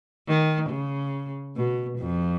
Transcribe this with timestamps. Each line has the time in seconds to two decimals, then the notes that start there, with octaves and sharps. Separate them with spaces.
0.28 D#3
0.70 C#3
1.56 B2
1.99 F2